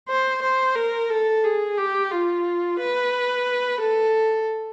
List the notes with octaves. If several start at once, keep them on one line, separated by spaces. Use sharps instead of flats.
C5
C5
A#4
A4
G#4
G4
F4
B4
A4